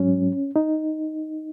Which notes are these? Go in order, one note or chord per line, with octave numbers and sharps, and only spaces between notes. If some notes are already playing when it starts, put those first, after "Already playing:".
Already playing: G#2 F#3 C#4
D#4